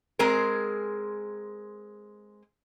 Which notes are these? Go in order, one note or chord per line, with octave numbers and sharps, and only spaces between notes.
G#3 C4 G#4 A#4